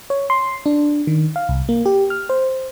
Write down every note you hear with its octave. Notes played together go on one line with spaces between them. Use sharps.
C#5
C6
D4
D#3
F5
C2
A#3
G4
F6
C5